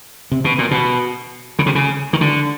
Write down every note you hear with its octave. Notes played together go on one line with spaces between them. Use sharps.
C3
B2
A#2
B2
C#3
C3
C#3
D#3
D3